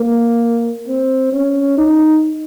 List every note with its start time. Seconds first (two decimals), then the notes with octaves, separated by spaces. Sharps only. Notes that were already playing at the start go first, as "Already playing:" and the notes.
Already playing: A#3
0.88 C4
1.32 C#4
1.78 D#4